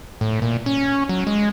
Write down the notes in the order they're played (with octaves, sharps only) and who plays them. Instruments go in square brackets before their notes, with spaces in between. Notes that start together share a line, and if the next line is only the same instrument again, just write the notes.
[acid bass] A2
A#2
C#4
F#3
G#3